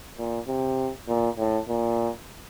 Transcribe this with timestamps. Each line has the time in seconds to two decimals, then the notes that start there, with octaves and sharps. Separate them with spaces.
0.18 A#2
0.48 C3
1.08 A#2
1.38 A2
1.68 A#2